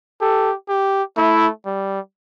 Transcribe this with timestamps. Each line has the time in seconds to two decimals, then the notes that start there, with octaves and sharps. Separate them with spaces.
0.21 G4 A4
0.69 G4
1.17 A3 E4
1.66 G3